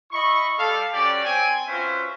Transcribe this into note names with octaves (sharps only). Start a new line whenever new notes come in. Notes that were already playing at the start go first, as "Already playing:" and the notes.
E4 D#5 B5 C#6
G3 A4 F5
G3 C#4 F#4 G4 D5
C4 G5 G#5
C#4 F4 F#4 B4 C5 E5